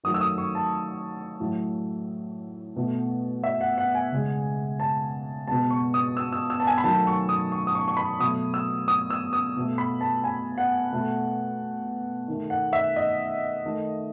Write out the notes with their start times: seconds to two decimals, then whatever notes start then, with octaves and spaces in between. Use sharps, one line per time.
0.04 D#3 F#3 A3 D#6
0.14 E6
0.21 D#6
0.38 C#6
0.55 A5
1.40 A2 F#3 A3
2.76 B2 A3
3.43 E5
3.61 F#5
3.78 F#5
3.95 G#5
4.12 C#3 G#3
4.80 A5
5.47 B2 G#3 A5
5.71 C#6
5.94 D#6
6.17 E6
6.32 E6
6.50 E6
6.60 A5
6.67 G#5
6.78 B5
6.84 D#3 F#3 A3 A5
7.07 C#6
7.29 D#6
7.52 C#6
7.67 D#6
7.75 C#6
7.88 C#6
7.97 B5
8.19 B2 F#3 A3 D#6
8.54 E6
8.88 D#6
9.10 E6
9.33 D#6
9.56 B2 A3
9.78 B5
10.01 A5
10.24 G#5
10.58 F#5
10.92 B2 A3
12.28 D#3 A3
12.50 F#5
12.73 E5
12.96 D#5
13.65 D#3 A3